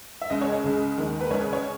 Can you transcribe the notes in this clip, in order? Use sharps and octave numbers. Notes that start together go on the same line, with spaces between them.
E5
C#2 C#3 G#3 D#5
C#5
D#5
C#2 C#3 G#3
D#2 D#3 G#3
B4
C#2 C#3 G#3 C#5
B4
C#5